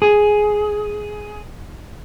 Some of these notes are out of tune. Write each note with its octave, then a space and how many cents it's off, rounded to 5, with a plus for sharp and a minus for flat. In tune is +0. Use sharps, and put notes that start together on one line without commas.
G#4 +10